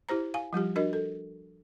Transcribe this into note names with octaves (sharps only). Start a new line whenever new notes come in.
E4 G4 C5 A#5
F5 G#5
F3 G3 F4 G4
D4 F#4 A#4 D#5
A4